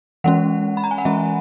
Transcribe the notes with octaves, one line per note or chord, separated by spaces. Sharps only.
E3 G#3 C#4 F#5
B5
A#5
G#5
F#5
E3 G#3 C#4 E5